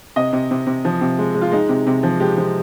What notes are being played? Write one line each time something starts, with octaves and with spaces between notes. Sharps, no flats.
C3 D#5
C3
C3
C3
F3
C3
G#3
G#3
F4
G#3 D#4
C3
C3
F3
G#3 G4
F3